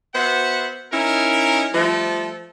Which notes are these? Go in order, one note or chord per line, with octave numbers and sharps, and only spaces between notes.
B3 F#4 C5 E5 F#5
C#4 D#4 E4 A#4
F3 G3 A3 A4